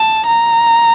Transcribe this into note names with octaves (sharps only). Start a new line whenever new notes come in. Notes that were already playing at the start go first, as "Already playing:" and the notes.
Already playing: A5
A#5